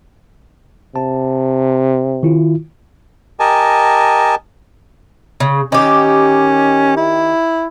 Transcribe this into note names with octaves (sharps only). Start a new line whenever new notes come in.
C3 A5
D#3 E4 F4
G4 A#4 D#5 G#5 A5
C#3
D#3 C#4 G4
E4